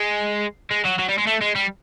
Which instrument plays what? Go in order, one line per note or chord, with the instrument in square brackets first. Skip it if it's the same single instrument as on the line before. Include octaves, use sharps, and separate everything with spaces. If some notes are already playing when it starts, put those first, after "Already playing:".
Already playing: [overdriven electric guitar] G#3
G#3
F#3
F#3
G3
G#3
A3
G#3
G3